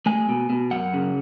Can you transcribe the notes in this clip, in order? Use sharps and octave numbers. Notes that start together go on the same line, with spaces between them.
A3 G#5
B2
B2
F#2 F#5
C#3